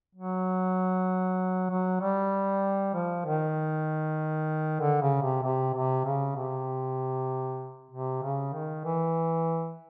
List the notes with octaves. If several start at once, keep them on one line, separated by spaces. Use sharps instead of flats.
F#3
F#3
G3
F3
D#3
D3
C#3
C3
C3
C3
C#3
C3
C3
C#3
D#3
E3